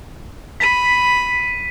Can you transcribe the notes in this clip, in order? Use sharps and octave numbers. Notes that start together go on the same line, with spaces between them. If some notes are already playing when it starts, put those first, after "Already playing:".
B5 B6 D#7